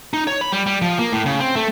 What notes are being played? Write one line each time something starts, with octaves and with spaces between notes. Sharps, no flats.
D#4
C#5
B5
G3
G3
F3
A#3
A2
C#3
C4
A3